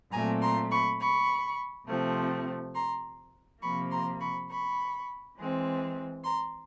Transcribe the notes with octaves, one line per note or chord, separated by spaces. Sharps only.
A#2 F#3 A3 C4 G#5 A#5
A#5 C6
B5 C#6
B5 C#6
C3 F3 A3 C4
A#5 C6
C3 F3 A#3 B5 C#6
A#5 C6
B5 C#6
B5 C#6
E3 G#3 C4
A#5 C6